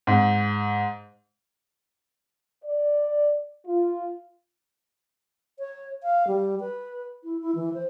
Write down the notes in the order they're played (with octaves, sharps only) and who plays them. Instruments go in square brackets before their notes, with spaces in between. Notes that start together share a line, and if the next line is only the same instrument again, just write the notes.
[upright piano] G#2
[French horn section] D5
F4
[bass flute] C#5
F5
G3
B4
E4
E4
E3
C5